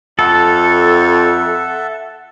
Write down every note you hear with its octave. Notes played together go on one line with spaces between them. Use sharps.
F2 A4 E5 F#5